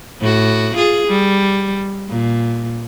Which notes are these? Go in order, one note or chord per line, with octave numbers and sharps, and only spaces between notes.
A2 F#4
F4 G#4
G3
A#2